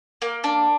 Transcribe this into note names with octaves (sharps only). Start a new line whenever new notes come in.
A#3
D4